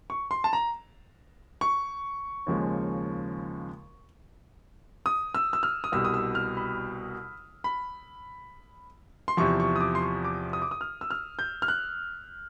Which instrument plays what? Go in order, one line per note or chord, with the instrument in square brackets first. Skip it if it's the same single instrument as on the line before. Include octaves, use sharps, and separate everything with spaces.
[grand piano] C#6
C6
A5
A#5
C#6
D#2 C#3 F3 G#3
D#6
E6
E6
F6
D#6
C2 B2 G3 E6
D#6
E6
F6
B5
B5
C6
E2 C3 F3 C#6
C#6
D#6
D6
C6
C#6
D6
D#6
D6
D#6
F6
E6
F6
G6
F6
F#6